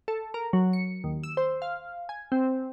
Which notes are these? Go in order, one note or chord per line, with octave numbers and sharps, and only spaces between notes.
A4
A#4
F#3
C#7
D#2
E6
C5
F5
G#5
C4